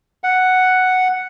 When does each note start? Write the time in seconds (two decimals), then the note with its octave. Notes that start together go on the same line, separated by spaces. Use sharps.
0.24 F#5